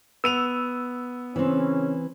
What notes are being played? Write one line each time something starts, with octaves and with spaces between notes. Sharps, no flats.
B3 E6 D#7 F7
C#3 E3 C4 C#4